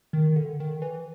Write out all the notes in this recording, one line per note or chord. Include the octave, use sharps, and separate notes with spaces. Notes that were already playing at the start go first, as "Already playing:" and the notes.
D#3
D3
D#3
E3